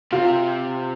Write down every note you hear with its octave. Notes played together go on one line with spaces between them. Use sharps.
C3 F4